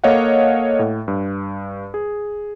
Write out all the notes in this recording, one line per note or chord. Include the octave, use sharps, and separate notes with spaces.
A#3 A4 C#5 D#5 F5 F#5
A2
G2
G#4